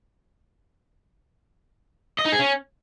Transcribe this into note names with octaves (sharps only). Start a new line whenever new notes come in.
D#5
D#4
G#4
C#4